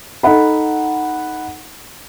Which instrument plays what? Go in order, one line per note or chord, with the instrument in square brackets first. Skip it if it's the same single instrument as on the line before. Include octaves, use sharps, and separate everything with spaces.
[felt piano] D#4 A4 F#5 B5